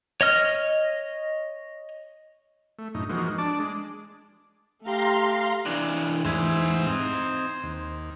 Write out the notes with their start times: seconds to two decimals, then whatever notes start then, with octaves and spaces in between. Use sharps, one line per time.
0.21 C#5 D#5 F6
2.79 A3
2.95 F#2 A2 D#4
3.09 E3 F3 G#3 A#3 D#4 F#4
3.38 D4 A5 D6
3.59 G#3
4.82 A3 G4 F5 A#5 C6
5.66 E3 D4
6.25 E2 G#2 E3 C5 G#5
6.86 C4 D#4
7.64 D#2